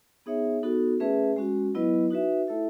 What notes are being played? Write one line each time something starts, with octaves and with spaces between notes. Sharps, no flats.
B3 D#4 G#4 C#5 E5
B3 D#4 F#4 A4
A3 C#4 G#4 B4 E5
G#3 C#4 F#4
F#3 B3 E4 B4 D#5
D#4 F#4 B4 E5
A3 E4 A4 E5